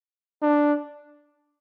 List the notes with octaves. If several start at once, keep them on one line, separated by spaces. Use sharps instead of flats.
D4